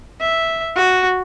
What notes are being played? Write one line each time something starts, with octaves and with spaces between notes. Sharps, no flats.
E5
F#4